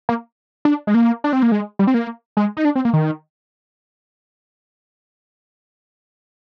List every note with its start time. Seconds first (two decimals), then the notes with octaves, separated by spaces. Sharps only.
0.09 A#3
0.65 D4
0.87 G#3
0.94 A#3
1.24 D4
1.33 C4
1.42 A#3
1.52 G#3
1.79 G3
1.87 C4
1.94 A#3
2.37 G#3
2.57 D#4
2.65 D4
2.75 C4
2.85 A#3
2.93 D#3